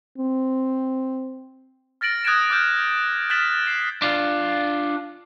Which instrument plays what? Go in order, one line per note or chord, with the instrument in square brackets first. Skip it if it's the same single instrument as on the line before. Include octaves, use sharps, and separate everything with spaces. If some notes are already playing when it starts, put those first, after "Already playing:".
[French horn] C4
[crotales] F6 A6 A#6 D7 F#7
D#6 F#6 G#6 A6 D7 E7
D6 D#6 F6 G6 E7
F6 F#6 A6 B6 E7 F#7
C7 E7
[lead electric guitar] D4 F4